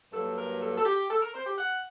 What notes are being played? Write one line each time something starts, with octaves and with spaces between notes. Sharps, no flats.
G2 F#3 A#3 A4
A#4
A4
A4
G4
A4
A#4
C5
G4
F#5